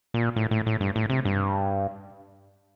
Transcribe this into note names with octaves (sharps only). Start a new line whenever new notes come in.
A#2
A2
A2
A2
G2
A2
C3
G2